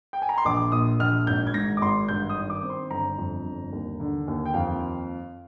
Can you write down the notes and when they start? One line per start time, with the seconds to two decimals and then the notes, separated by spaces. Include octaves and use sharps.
0.13 G5
0.22 G#5
0.29 A#5
0.38 C6
0.45 A#1 D6
0.72 A#2 D#6
0.99 A#1 F6
1.27 G#1 G6
1.47 G#6
1.54 G#2 A#6
1.77 D6
1.81 G#1 C6
2.08 G2 G6
2.29 D#6
2.36 D#3
2.50 D6
2.63 C4
2.70 C6
2.90 G1 A#5
3.18 F2
3.45 G1
3.72 D#2
4.00 D3
4.28 D#2
4.46 G5
4.54 F2 F5